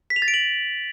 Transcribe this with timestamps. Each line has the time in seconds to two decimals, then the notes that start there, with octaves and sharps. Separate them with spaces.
0.10 B6
0.16 F7
0.22 A6
0.28 D7
0.34 F#7